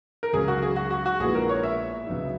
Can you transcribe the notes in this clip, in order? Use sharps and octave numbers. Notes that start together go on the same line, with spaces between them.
A#4
C#2 C#3 F#3 G#4
F#4
G#4
F#4
F#4
F#4
A#1 A#2 G#3 B3 E4 G#4
A#4
C#5
E5
C#2 C#3 F#3 B3 D#4